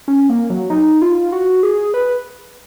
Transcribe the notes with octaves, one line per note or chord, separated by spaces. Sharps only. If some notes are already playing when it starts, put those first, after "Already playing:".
C#4
A#3
F#3
D#4
F4
F#4
G#4
B4